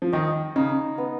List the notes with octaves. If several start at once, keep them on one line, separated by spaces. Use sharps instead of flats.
F3
D#3 D#5
C#3 D#4
B3